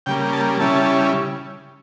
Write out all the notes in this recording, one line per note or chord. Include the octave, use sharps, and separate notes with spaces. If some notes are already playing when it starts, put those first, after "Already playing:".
C#3 G3 A#3 G5
A5
C#3 G3 C#4 E4 A5